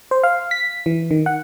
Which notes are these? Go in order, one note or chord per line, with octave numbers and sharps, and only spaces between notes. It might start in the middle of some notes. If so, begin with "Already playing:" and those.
C5
F5
B6
E3
D#3
F#5